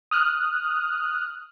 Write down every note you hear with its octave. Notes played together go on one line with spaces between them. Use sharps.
D#6 F6 F#6